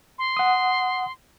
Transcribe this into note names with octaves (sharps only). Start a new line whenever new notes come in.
C6
F#5 D#6